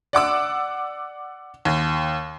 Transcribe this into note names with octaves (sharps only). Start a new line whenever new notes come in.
D5 F#5 D6 E6
D#2